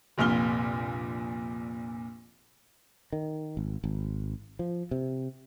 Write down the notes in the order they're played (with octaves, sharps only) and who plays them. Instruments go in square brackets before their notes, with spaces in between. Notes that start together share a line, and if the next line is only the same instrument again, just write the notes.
[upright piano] F1 A#1 A#2 F6 G7
[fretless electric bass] D#3
G#1
G#1
F3
C3